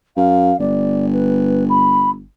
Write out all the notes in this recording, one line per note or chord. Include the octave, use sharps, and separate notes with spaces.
F#2 F5
G1 D5
B4
B5